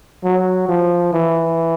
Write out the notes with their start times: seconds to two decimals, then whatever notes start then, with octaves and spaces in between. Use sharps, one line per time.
0.24 F#3
0.69 F3
1.13 E3